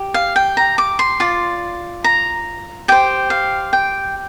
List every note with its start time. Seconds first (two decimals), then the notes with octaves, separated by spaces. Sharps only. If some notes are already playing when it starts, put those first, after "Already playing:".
Already playing: G4
0.14 F5
0.36 G5
0.57 A#5
0.78 D6
0.99 C6
1.20 F4 D5
2.04 A#5
2.88 G4 C5 G5
3.30 F5
3.73 G5